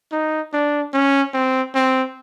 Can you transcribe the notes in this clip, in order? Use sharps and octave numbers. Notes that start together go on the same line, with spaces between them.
D#4
D4
C#4
C4
C4